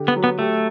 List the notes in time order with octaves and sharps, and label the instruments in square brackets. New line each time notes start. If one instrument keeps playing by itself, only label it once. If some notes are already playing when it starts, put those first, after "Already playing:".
Already playing: [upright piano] D3 G4
[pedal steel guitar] B3
[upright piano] F#3
[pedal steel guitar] B3
[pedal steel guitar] A3 [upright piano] G4